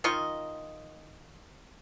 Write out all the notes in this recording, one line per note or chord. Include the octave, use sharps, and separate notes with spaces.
D#3 F4 D#5 C#6